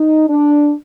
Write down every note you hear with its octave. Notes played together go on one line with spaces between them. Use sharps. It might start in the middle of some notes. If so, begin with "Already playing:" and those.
Already playing: D#4
D4